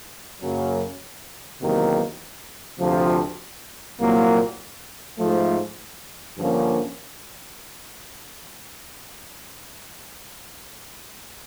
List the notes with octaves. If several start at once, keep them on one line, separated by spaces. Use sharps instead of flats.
F#2 C#3 F#3 A#3 C#4
E2 C3 D#3 F#3 A#3
D2 C3 F3
C2 A#2 F#3 A#3
G#2 F3 A3
G2 D3 F3 A#3 C#4